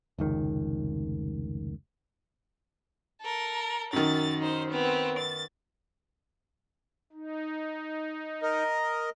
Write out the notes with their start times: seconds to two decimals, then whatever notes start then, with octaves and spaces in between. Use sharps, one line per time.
0.18 F1 C#2 D#3
3.21 A4 A#4
3.93 F#2 D#3 A6
4.40 D#4 C5
4.71 B3 C4
5.17 A6
7.13 D#4
8.43 A#4 D#5